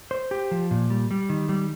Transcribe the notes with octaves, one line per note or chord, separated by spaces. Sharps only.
C5
G4
F3
A#2
G3
G3
D#3
G3